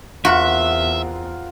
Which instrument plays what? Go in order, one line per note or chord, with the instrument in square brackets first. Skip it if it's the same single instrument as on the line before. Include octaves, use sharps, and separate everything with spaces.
[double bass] E2 C4 [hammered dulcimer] F4 A#4 F#5 [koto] F#4 [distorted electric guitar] E5